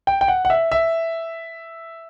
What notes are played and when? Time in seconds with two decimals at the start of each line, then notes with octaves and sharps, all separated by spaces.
0.07 G5
0.21 G5
0.28 F#5
0.45 F#5
0.50 E5
0.72 E5